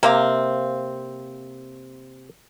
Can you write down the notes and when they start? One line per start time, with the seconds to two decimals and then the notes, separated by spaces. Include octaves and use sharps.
0.03 C3 A#3 C4 F5